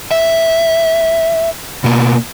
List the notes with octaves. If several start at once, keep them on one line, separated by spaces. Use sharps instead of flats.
E5
B2 A#3